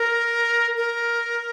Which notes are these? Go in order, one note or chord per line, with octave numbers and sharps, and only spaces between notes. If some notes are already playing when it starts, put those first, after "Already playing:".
Already playing: A#4
A#4